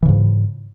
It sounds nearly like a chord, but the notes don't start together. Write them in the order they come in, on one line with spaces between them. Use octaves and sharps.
E3 C#3 G#2